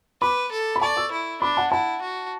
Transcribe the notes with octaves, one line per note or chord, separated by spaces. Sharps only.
B4 B5 D6
A4
B5
D5 A5 C#6
C#6 E6
E4
D4 B5 D6
F#5 A5
E4 F#5 A5
F#4